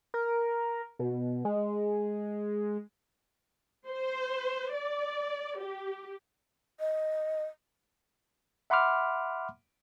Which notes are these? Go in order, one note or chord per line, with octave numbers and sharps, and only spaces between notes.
A#4
B2
G#3
C5
D5
G4
D#5
E5 F#5 B5 C6 D6 F6